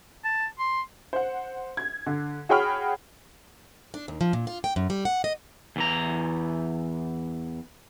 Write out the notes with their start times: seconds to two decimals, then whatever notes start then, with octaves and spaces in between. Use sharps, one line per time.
0.24 A5
0.59 C6
1.13 C5 F#5
1.77 G#6
2.06 D3
2.49 F#4 G#4 C#5 G5 B5 F6
3.94 D4
4.08 D#2
4.21 F3
4.33 A#2
4.47 F4
4.64 G5
4.76 F#2
4.90 G3
5.05 F#5
5.24 D#5
5.76 E2 E3 A#5